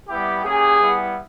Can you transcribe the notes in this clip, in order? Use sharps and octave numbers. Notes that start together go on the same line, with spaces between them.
G3 B3 E4 G4
A#3 C#4 G4 G#4
G3 B3 E4